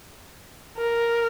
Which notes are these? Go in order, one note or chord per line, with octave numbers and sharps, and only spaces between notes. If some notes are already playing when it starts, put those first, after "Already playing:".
A#4